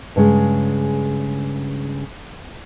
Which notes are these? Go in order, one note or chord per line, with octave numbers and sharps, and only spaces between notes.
G2 C#3 G#3